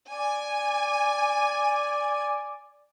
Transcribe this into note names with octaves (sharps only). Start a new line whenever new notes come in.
D5 G#5